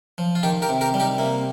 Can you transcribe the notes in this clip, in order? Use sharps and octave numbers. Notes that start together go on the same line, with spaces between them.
F3
F4
D#3 D#4 G4
G4 A#4
C3
G4 A#4
G3
D#4 G4
C3 A#3